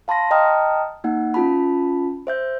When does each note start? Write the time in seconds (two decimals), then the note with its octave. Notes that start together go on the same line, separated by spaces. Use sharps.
0.08 F5 A5 B5 C6 A#6
0.31 D#5 G5 A5 A#5 D#6 F6
1.04 A#3 D#4 F#5
1.34 C#4 F4 A5 B5
2.27 C5 E5 G6